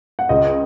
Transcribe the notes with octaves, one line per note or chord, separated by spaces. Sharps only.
F#5
C#2 D#5